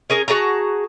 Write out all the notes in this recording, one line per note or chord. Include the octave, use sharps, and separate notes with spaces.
C#4 G#4 A#4
F#4 G#4 A5 A#5